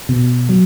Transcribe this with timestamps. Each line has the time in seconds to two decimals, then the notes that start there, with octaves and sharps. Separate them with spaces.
0.09 B2
0.49 F#3